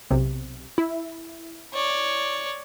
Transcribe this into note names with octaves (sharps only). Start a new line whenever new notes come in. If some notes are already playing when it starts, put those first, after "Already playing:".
B1 C3
E4
C#5 D5